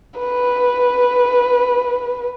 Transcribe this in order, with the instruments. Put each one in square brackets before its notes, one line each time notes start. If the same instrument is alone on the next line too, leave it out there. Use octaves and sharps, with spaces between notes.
[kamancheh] B4